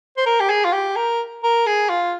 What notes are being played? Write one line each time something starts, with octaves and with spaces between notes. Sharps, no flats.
C5
A#4
G4
G#4
F4
G4
A#4
A#4
G#4
F4